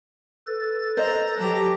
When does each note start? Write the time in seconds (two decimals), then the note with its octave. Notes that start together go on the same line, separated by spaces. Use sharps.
0.47 A4 B4 A6
0.97 C5 D#5 A#5
1.37 F#3 G4 A4 A#5